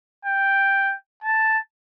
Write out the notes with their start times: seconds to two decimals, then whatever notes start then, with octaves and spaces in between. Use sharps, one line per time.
0.25 G5
1.24 A5